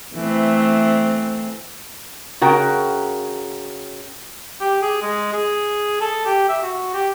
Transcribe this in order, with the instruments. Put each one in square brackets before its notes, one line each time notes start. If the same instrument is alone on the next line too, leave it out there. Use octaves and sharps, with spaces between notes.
[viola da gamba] E3 A3 C4
[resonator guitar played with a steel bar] C#3 F#4 A#4 G5
[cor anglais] G4
G#4
G#3
G#4
A4
G4
E5
F#4
G4